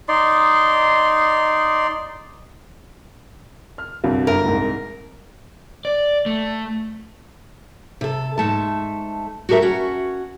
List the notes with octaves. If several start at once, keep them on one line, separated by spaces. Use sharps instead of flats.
D#4 D5 C6
F6
C2 G2 F#3
G1 A#4 E5
C2 G#2
D5
A3
C3 A4
G#2 A3 A5
F#4 G4 A4 A#4 E5
C#4 F#4